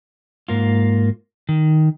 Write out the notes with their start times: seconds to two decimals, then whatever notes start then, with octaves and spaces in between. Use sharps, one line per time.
0.48 G#2 A#3 F4
1.49 D#3